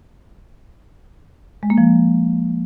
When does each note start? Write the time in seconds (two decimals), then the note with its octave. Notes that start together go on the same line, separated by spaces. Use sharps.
1.63 G#3
1.70 A#3
1.78 F3